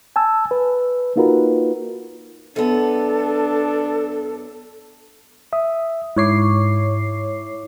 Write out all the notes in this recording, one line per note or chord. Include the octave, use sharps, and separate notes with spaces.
G#5 A5 E6
B4
A#3 D#4 F4 F#4 A#4 B4
F#2 B3 D4 A4
E5 D#6
G#2 E4 C#5 D6 C7